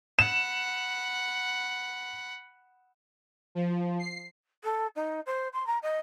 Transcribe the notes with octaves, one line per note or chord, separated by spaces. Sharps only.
F#5 B5 E7
F3
C7
A4
D#4
C5
C6
A#5
D#5